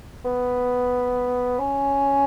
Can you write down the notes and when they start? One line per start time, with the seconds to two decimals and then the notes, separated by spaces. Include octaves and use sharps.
0.25 B3
1.59 C#4